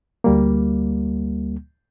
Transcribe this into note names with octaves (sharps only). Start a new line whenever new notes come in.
D2 G3 A#3